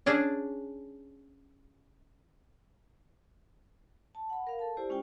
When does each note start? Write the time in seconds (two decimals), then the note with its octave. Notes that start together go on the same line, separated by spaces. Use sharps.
0.06 C#4 D4 G#4 D5
4.15 A5
4.30 F#5 B5
4.47 A#4 F5
4.59 A4 A5
4.77 E4 G4 C5 D5
4.89 G#3 C#4 F4 G5